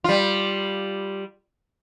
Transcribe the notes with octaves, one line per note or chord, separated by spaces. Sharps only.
G3 F4